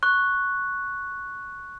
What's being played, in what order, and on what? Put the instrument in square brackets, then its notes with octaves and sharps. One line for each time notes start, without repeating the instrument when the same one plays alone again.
[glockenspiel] C#6 F#6